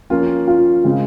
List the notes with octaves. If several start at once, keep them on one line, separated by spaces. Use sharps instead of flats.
F3 A#3 C#4 F4
F4
C#3 G#3 C4